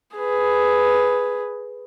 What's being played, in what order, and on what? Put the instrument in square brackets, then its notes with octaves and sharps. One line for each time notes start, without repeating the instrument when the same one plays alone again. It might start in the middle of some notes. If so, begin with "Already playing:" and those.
[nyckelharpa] G#4 B4